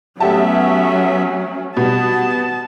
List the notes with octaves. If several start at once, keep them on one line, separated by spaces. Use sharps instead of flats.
F#3 A3 B3 C#4 G4 E5 A5
B2 G3 B3 A5